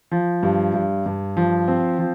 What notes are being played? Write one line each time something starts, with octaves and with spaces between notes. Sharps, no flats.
F3
G2
G2
G2
F3
C4
F3